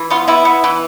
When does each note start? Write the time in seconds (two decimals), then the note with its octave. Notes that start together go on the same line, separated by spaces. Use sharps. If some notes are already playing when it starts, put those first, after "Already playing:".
Already playing: E3
0.10 B3 F4
0.28 B3 E4
0.45 B3
0.64 E3